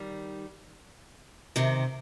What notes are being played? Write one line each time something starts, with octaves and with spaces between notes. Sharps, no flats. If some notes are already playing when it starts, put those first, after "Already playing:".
Already playing: D#3 G3
C3 D#3